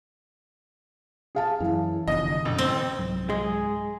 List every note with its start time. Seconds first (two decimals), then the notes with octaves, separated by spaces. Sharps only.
1.35 G#4 F5 A5
1.60 F#2 E3
2.08 F1 D3 B3 D#5
2.45 A1 F#2 B2 D3
2.58 C4
2.99 C2 G#2 F#3
3.30 G#3 G#4